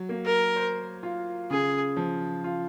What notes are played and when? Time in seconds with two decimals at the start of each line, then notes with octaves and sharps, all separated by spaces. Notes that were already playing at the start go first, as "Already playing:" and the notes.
Already playing: F#3
0.09 A#3
0.25 A#4
0.56 C5
1.03 F4
1.50 C#3 G#4
1.96 F3
2.44 F4